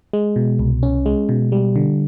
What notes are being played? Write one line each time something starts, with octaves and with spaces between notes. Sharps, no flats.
G#3
B2
C2
C#4
G#3
B2
G3
D3